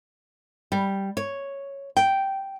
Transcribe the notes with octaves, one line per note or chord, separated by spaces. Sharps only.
G3
C#5
G5